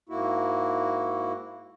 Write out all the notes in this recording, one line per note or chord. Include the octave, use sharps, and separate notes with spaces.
G#2 A#3 E4 F#4